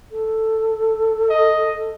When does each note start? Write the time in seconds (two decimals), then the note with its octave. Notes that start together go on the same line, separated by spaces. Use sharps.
0.12 A4
1.30 D#5